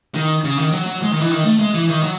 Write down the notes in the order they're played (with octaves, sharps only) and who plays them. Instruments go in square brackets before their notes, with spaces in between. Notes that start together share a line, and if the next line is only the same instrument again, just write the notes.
[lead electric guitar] D#3
C#3
D#3
F#3
F#3
G#3
D#3
E3
D#3
A3
G#3
E3
D#3
F#3